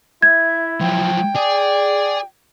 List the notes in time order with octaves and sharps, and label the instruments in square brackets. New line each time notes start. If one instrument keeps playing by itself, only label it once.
[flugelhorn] E4 [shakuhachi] E5 [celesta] G#6
[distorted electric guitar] F3 F#3 [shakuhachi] G5
[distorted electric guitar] G#4 [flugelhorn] D5